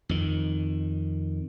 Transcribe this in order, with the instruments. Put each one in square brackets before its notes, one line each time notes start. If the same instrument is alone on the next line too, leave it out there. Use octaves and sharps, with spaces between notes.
[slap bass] F2 D#3